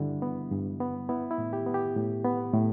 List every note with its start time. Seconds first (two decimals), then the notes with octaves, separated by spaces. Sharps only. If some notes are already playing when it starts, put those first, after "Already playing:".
Already playing: G2 D3 G3 E4
0.22 B3
0.51 G2
0.80 B3
1.09 B3 E4
1.31 E4
1.38 A2
1.53 G4
1.66 B3
1.74 G4
1.96 A2
2.24 B3
2.54 A2